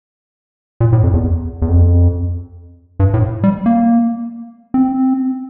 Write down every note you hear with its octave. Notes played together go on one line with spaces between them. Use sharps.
A#2
A2
F2
E2
E2
F2
G2
A2
G3
A#3
C4